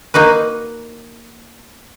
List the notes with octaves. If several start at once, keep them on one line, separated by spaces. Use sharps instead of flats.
A#3 D#4 F#4 B4